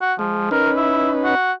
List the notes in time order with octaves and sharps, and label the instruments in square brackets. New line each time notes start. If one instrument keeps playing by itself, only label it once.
[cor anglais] F#4
[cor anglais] F3 [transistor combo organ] G#3
[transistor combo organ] C#4 D#4 B4 [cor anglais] A#4
[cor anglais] E4
F#4